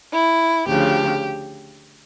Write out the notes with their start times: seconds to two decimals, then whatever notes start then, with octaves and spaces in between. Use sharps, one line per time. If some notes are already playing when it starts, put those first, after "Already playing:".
0.13 E4
0.67 D2 C#3 F3 G4